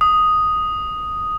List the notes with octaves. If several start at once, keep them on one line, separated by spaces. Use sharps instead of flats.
D#6